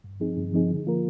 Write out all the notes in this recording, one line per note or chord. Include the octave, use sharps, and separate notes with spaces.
G2
F3 C4 D#4 G#4
G2
F3 C4 D#4 G#4
D3
F3 A#3 F4 A#4